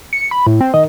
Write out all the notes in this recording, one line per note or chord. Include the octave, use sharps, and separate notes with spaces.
C#7
B5
A2
C4
D#3 D#5